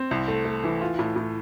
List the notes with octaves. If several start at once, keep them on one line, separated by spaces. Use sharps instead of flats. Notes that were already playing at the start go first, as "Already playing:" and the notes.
Already playing: C4
C2
A3
A3
E3
F4
A2
A2